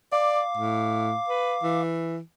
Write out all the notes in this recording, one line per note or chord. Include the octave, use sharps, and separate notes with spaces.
D5 F5 D6
A2
B4
E3